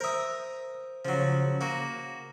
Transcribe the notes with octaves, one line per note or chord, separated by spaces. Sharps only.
A#4 C5 E5 D#6
C#3 F3 F#3
A#3 F#4